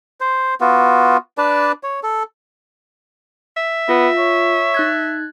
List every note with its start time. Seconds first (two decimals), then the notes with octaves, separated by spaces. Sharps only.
0.21 C5
0.61 B3 F4 F#4
1.38 D4 B4 D5 A5
1.83 C#5
2.03 A4
3.57 E5
3.89 B3 F4
4.18 C#5
4.74 D#4 F#6 G#6